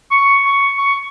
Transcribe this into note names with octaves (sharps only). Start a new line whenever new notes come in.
C#6
C#6
C#6